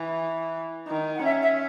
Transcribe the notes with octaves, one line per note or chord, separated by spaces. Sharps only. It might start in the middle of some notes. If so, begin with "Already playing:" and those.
Already playing: E3
D#3
F#5
C#4 E5
E5